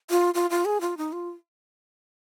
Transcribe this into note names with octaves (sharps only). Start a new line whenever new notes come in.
F4
F4
F4
G#4
F4
D#4
F4